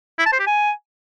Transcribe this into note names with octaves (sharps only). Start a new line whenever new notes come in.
E4
A5
C5
G4
G#5